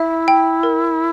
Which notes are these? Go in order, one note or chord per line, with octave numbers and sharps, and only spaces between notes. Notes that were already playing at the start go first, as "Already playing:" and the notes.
Already playing: E4 E5
G5
A#4